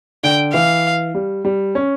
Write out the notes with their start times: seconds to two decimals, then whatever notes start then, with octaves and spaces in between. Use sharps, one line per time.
0.23 D3 G5
0.54 E3 F5
1.15 G3
1.45 G3
1.75 C#4